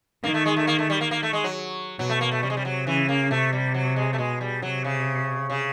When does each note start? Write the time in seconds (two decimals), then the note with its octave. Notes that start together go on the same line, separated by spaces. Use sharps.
0.24 D#3 A#3
0.34 A3
0.46 G#3
0.57 A3
0.67 A#3
0.79 A3
0.90 G3
1.01 A#3
1.11 A#3
1.23 A3
1.33 G#3
1.44 F#3
1.99 B2 F#3
2.10 A3
2.21 A#3
2.31 A3
2.43 C3 G3
2.50 G#3
2.57 G3
2.65 F#3
2.87 C#3 E3
3.09 A#3
3.31 C3 A3
3.53 G3
3.74 F#3
3.96 G#3
4.13 A3
4.18 B2 G#3
4.41 G3
4.62 C3 F#3
4.85 C#3
5.50 C#3